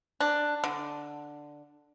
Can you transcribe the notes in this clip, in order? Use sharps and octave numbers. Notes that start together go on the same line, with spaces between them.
D4
D3